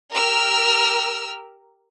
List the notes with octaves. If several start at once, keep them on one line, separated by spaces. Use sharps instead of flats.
G4 A#4 E6 F6